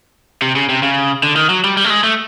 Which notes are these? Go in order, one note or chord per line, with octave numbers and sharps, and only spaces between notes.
C3
C#3
C3
C#3
D3
D#3
F#3
G3
G3
A3
G#3
A3